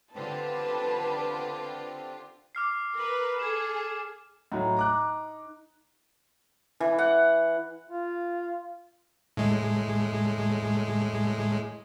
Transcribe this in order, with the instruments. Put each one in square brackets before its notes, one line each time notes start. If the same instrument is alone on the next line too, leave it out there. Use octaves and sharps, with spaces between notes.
[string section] D3 F4 G4 [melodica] C4 D4 [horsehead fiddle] B4 [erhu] A5
[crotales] D6 F6 C7
[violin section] A#4 B4
[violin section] G#4 A4 [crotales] E7
[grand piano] A2 F#3 [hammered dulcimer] D#4
[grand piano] A#5 D6 F#6
[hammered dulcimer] E3
F#5
[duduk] F4
[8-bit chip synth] A2 G#3